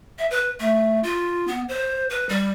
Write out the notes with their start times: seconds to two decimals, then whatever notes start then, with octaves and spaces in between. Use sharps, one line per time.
0.19 E5
0.31 B4
0.60 A3
1.03 F4
1.48 B3
1.69 C5
2.10 B4
2.29 G3